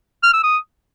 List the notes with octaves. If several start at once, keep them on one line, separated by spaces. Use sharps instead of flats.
F6
E6
D#6